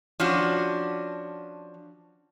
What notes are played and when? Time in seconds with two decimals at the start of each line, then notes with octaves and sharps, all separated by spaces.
0.20 F3 C#4 D4 F#4